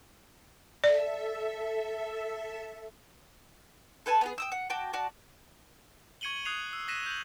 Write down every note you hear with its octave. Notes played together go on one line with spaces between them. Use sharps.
A4 D5 E5
A4 B4 G#5 A5
B3 D#4 G#4
G5 D#6 E6
F#5
F#4 G5 A5 D6
F#4 D5 A5
C#6 G#6 C#7 D#7 F#7 G7
D#6 F#6 G#6 C7 F7
E6
D#6 F#6 A#6 B6 D#7 E7
G6 F#7